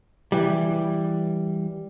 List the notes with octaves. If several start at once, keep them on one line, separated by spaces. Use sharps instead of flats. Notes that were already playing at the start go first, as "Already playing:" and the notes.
E3 G3